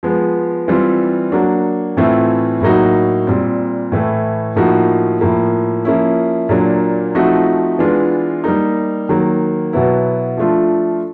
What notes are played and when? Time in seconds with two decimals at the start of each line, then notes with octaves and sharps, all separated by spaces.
0.03 F3 G#3 B3
0.68 E3 G3 C4 F4
1.32 F#3 A#3 D4 F#4
1.97 A2 E3 A3 C4 F4
2.61 A2 F#3 A#3 D#4 F#4
3.27 A#2 G3 C4
3.92 A2 E3 A3
4.56 A2 F3 A#3 D#4 F#4
5.21 A2 F3 A#3
5.85 F3 A#3 C#4 E4
6.49 A#2 F#3 A#3 D4
7.15 F3 A3 C4 D#4 F#4
7.79 E3 G#3 B3 D4 F4
8.44 G3 A#3 D#4
9.09 D#3 F#3 A#3
9.73 B2 F#3 B3 E4
10.37 F3 A3 D4 F4